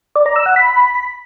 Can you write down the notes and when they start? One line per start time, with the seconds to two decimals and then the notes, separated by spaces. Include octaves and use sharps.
0.16 D5
0.26 A#5
0.36 E6
0.46 F#5
0.56 B5